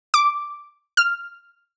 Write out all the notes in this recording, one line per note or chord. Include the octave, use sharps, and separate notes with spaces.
D6
F6